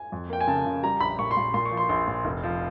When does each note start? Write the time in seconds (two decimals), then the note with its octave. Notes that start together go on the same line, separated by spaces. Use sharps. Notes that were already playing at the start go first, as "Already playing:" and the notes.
Already playing: G#5
0.12 F2
0.30 A#3 G5
0.41 G#5
0.47 C#3 A5
0.66 C#3
0.83 G3 A#5
1.00 A#1 B5
1.19 A#2 C#6
1.31 C6
1.37 A#2
1.54 A#2 C6
1.66 C#6
1.71 F3
1.77 C6
1.89 A#1 C6
2.08 A#2
2.25 F1
2.43 F3